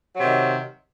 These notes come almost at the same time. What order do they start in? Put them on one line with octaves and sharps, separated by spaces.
F#3 C3 D#3